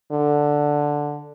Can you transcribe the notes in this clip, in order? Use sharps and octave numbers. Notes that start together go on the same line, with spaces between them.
D3